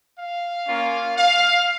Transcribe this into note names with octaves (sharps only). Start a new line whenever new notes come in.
F5
A#3 C#4 F4
F5